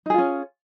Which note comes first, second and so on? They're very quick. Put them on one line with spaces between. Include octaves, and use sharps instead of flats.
D#4 G#4 F4 C#4